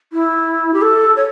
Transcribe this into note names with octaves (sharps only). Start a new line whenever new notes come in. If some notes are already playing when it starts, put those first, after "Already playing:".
E4
G4
A4
C#5